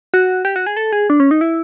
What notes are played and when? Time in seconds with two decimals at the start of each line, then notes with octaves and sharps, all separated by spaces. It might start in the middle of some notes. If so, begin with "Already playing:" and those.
0.14 F#4
0.45 G4
0.56 F#4
0.66 G#4
0.77 A4
0.92 G#4
1.10 D4
1.20 C#4
1.31 D#4
1.41 E4